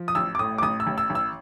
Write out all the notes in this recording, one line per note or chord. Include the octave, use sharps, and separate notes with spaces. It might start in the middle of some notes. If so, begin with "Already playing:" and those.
Already playing: F3
D#6
A1 E6
D6
A2 D#6
D6
A1 D#6
E6
A1
E6
A1
E6